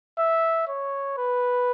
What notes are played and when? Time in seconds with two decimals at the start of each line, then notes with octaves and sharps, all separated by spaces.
0.19 E5
0.68 C#5
1.18 B4